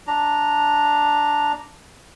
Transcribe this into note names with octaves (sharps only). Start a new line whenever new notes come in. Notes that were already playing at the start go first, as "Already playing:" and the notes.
D4 A#5